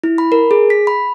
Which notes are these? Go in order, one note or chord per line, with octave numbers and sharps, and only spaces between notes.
E4
B5
A#4
G#4
B6
B5